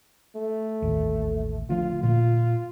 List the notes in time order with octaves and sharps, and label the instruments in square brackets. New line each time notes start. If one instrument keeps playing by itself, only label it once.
[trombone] A3
[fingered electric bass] A1 D#2
[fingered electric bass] D3 F3 A3 [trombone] F4
[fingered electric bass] A#2 [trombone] F4